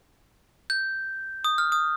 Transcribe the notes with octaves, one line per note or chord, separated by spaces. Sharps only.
G6
D#6
F6
D#6